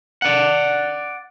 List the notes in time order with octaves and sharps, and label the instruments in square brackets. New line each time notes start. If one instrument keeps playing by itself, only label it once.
[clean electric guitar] D5 F#5